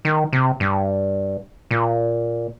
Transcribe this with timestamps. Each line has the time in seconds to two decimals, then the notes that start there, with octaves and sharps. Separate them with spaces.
0.05 D#3
0.33 C3
0.60 G2
1.71 A#2